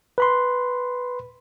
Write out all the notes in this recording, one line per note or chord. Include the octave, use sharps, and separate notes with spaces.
B4 B5 C6